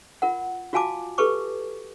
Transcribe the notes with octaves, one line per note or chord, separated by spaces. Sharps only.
F4 A#4 F#5
F4 F#4 F5 G#5 A5 D6
G4 A4 B4 C#6 D6